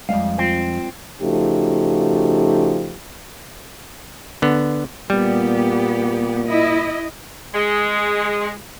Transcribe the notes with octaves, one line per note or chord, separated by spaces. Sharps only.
F2 G3 G#3 F5
C4 F4
C#3 F3 A3 D#4 F#4 G4
D3 B3
A#2 G3 B3 G4
E4 D#5
G#3